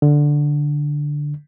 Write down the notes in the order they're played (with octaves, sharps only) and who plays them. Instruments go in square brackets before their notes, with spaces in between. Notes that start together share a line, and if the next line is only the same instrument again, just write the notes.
[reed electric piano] D3